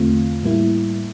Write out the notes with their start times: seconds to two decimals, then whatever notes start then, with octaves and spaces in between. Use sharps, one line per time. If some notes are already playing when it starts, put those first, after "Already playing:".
Already playing: E2 D3 A3 C4 F4
0.43 A2 G3 A#3 E4